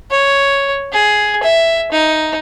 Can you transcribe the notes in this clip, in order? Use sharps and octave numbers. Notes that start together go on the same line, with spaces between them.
C#5
G#4
E5
D#4